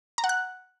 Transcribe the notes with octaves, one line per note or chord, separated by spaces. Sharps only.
A#5
F#5
F#6